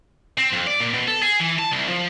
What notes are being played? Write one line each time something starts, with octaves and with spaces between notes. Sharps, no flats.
C4
F2
D5
A#2
B2
A4
G#4
E3
A5
C2
F3